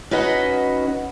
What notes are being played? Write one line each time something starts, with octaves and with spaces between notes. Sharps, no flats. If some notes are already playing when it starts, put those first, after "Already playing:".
C#4 D#4 F#4 B4 D#5 F#5